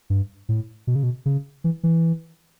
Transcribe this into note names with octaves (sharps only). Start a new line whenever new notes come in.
G2
A2
B2
C#3
B2
C#3
E3
E3